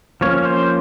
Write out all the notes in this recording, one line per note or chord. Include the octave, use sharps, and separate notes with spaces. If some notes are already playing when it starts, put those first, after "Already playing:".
F3 A#3 C#4 C#5
C5